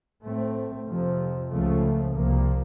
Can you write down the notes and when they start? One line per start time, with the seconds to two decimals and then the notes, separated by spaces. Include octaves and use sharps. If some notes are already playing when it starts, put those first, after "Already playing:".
0.23 A2 A3 C4
0.87 F2 C3 F3
1.51 C#2 C#3 F3 A3
2.15 C2 A#2 F3 A#3